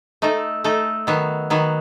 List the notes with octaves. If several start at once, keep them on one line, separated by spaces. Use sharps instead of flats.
A3 D#4 A4
A3 D#4 A4
D#3 F#3 B3
D#3 F#3 B3